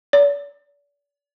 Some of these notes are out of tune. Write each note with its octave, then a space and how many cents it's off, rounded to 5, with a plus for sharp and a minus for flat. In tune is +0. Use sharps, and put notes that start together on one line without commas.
D5 -40